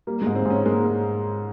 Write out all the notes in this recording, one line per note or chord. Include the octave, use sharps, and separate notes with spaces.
G3 A#3
G#3
G#2
C4
G#2 C#4
G#3 A#3